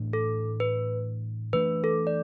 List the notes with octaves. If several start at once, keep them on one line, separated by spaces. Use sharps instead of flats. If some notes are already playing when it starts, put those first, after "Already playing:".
Already playing: A2 E3 A3 D4
A4
B4
E3 A3 D4 B4
A4
D5